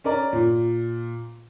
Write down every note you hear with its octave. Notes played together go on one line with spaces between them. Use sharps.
C#4 A#4 D5 A#5
A#2